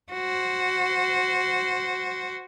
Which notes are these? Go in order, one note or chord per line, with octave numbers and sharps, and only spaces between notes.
F#4 C5